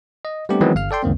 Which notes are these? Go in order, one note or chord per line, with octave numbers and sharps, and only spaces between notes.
D#5
G3 A3 B3 C4 D4 G4
D#3 E3 F#3 G#3 B3 C4
G1 F5 F6
A4 D5 G5 C6
C#2 F#2 D#3 A#3 C4